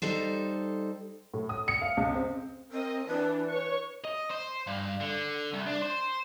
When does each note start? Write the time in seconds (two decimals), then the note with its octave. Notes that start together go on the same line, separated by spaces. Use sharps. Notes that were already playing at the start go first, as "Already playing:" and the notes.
0.02 G3 D#4 A4 C5
1.34 A2
1.49 D#6
1.68 C#7
1.82 F5
1.97 C#2
2.14 C4
2.72 C4 A#4 D#5
3.07 E3 D4 B4
3.49 C#5 C#6
4.05 D#5
4.31 C5
4.67 G2
5.00 D3
5.53 C2
5.67 D4
5.82 C5